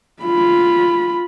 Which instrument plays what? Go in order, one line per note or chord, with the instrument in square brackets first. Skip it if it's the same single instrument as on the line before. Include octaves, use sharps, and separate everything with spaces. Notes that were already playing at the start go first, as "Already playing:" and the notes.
[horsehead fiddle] F4 B5